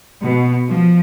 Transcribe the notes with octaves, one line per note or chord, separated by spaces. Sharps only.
B2
F3